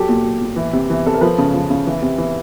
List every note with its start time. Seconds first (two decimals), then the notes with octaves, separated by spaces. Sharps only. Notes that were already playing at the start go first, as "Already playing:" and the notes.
Already playing: F#3 G4 A4
0.09 A#2
0.25 F#3
0.41 A#2
0.56 E3
0.73 C3
0.90 E3
1.06 C3 A4
1.14 A#4
1.21 F3 A4 B4
1.38 C#3
1.54 F3
1.70 C#3
1.87 E3
2.02 C3
2.18 E3